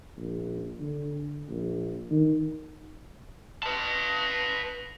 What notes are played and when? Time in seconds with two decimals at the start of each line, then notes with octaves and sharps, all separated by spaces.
0.18 A#1
0.81 D3
1.50 A#1
2.11 D#3
3.63 B4 A5